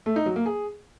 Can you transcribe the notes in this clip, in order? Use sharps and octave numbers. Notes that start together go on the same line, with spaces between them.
A3
D#4
F#3
A#3
G#4